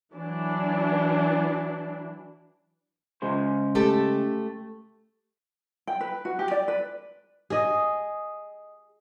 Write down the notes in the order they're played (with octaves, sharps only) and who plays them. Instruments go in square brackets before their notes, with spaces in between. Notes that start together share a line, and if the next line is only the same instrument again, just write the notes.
[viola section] E3 F#3 D4
[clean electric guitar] C#3 G#3 C5
[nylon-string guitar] A3 G4 A4
[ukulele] G5
B4
F#4
G4
D5
B4
[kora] G#4 D#5